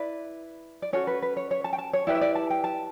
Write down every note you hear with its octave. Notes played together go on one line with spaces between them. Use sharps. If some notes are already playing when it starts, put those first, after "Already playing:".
Already playing: E4 B4 D5
D5
C#4 F#4 A4 C#5
B4
B4
C#5
C#5
A5
G5
A5
C#5
E4 G4 B4 D5
E5
D5
A5
G5
A5